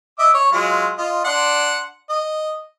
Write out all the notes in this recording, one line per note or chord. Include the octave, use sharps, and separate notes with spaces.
D#5 E5 D6
C#5
F#3 G#3 F4
F4 D#5
D4 F#5 C6
D#5